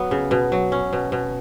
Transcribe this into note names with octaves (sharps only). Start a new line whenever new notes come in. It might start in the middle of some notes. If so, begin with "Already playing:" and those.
Already playing: F#3 B3
C#3
B2
F#3
C#4
B2
B2